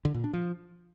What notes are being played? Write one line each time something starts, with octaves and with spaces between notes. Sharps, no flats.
D3
A#2
D4
F3